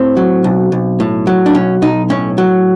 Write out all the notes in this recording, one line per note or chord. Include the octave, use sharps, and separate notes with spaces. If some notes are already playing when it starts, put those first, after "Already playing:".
Already playing: A2 C4
F#3
B1
B1
A2
F#3
D4
B1 C#4
B1 D#4
A2 C#4
F#3